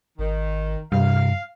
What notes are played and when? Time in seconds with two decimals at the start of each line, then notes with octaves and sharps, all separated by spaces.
0.18 G#1 D#3
0.92 G2 C3 F5